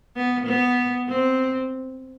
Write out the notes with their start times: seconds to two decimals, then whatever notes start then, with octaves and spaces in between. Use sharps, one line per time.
0.16 B3
0.46 B3
1.08 C4